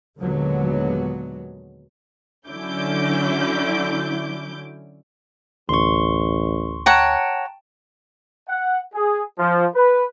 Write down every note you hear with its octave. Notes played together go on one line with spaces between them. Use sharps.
D#2 A#2 D3 F#3 G#3 B3
D3 F#3 C#4 E4 D6 G6
A1 D2 C6 C#6
C#5 F#5 G5 A5 A#5
F#5
G#4
F3
B4